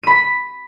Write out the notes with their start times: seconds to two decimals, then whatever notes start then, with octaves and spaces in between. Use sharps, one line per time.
0.03 D#7
0.07 B5
0.11 B6